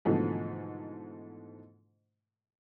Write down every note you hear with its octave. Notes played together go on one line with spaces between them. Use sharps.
G#2 B2 D3 E3 F3 A3